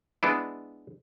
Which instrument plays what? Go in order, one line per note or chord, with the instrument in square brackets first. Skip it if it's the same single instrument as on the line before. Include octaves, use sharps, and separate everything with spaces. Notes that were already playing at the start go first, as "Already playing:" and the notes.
[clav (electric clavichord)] G#3 B3 D4 E4